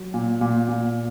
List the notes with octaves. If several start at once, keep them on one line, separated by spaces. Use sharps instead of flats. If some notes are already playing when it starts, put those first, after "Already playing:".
Already playing: F#3
A#2
A#2
A#2